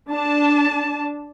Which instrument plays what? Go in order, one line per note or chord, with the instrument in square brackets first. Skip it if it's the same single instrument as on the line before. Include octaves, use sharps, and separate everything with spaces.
[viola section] D4 A5